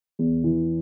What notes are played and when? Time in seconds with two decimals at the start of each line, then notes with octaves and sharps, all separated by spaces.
0.19 E2
0.44 E3